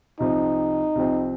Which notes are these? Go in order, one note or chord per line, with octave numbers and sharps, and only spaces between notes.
C2 C3 F3 C4 D#4
C2 C3 F3 C4